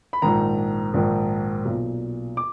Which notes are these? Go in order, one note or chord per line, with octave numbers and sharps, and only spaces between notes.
B5
A#1 G#2 D#3 A#5
A#1 G#2 D#3
B1 A#2
D6